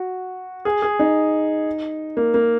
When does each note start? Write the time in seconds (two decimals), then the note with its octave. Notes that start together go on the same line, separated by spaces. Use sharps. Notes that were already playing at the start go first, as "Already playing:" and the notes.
Already playing: F#4
0.65 G#4
0.82 G#4
0.99 D#4
2.17 A#3
2.34 A#3